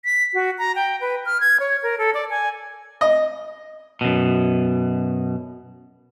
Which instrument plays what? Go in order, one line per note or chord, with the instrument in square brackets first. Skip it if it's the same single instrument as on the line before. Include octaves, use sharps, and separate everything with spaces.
[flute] B6
F#4
A#5
G5
B4
F6
G#6
C#5
A#4
A4
D5
G#5
[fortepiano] D#5
[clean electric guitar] F#2 B2